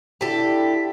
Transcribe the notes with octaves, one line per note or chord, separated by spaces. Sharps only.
D3 E4 G4 A4 B6